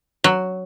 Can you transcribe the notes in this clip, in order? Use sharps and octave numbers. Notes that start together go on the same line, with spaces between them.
F#3